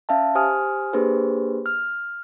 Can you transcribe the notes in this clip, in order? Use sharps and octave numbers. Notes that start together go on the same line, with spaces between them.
C#4 E5 F5 A5
G4 C5 G#5 D#6 F6
A#3 D4 G4 G#4 B4 C5
F6